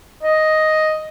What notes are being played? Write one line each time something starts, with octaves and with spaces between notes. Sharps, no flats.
D#5